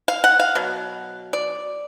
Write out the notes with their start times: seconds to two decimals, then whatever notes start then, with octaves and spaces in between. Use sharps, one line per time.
0.08 F5
0.24 F#5
0.39 F5
0.55 B2 F#3
1.33 D5